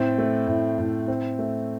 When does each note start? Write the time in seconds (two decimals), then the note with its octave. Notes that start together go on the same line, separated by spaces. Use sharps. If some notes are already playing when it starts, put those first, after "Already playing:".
Already playing: A2 C4
0.18 A3
0.47 A2
0.78 A2
1.08 C4
1.39 A3